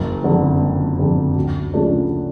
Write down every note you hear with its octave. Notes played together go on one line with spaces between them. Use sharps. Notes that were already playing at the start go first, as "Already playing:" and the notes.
Already playing: F#1
F2 D3
F#1
F2 D3
D2
C#3 F3 A3 D4